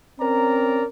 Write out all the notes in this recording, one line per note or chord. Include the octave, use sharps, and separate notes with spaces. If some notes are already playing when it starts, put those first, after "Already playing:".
C4 C#4 A#4 D5 A#5